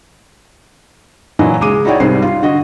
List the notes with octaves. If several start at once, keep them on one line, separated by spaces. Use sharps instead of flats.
A#2 E3 F#3 D#5 G#5
C#2 G#3 D6 D#7
D#4 E4 F#4 C#5 D5 G5
C2 G#2 G3 C4 C7
F4
D3 F#4 D#5